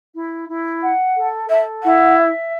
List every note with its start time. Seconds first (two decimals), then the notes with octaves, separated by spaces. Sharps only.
0.14 E4
0.49 E4
0.81 F#5
1.16 A4
1.50 A4 E5
1.83 E4 F#5
2.17 E5